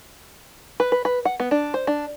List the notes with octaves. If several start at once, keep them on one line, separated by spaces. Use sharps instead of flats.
B4
B4
B4
F#5
B3
D4
C5
D4